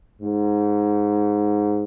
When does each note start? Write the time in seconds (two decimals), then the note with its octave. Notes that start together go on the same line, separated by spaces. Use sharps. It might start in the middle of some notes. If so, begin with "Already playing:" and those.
0.21 G#2